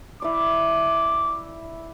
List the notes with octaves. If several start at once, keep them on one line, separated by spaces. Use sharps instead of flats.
E4 D5 D6